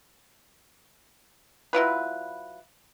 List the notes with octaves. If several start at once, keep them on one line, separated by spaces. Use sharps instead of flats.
F#3 E4 F4 B4